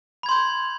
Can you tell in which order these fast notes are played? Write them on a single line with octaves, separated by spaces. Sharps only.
B5 G#6 C6 G6